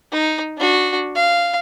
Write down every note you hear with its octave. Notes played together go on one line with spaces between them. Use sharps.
D#4
D4 F#4
F5